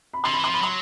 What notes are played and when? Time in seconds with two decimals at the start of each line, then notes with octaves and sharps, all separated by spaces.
0.14 B5
0.24 D3 C6
0.33 E3 B5
0.44 C6
0.49 F3 B5
0.62 F#3 C6